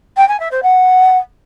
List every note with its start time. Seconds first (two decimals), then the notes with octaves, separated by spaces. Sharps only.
0.17 G5
0.28 G#5
0.40 E5
0.51 C5
0.63 F#5